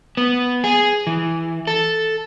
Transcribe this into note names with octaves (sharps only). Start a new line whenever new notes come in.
B3
G#4
E3
A4